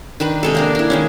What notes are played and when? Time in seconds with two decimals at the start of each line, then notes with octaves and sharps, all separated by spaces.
0.20 D#3 D4 B4 B5
0.43 C3 G#3 A4
0.55 A#3 D4 A#4
0.75 D4 E4
0.90 D#3 G#3 C#4